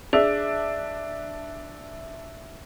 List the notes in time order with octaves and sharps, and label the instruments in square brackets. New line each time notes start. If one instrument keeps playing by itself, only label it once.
[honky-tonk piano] D4 [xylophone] G#4 [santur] E5